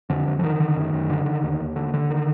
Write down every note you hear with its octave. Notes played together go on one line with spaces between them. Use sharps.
F2 D3
F2
F3
D3 D#3
D3
F#2
F#2
D3
D3
D#2
D#2
D3
D3
D#3